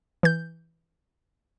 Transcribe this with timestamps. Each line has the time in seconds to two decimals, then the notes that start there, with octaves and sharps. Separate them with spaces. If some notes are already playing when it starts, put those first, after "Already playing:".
0.23 E3 G6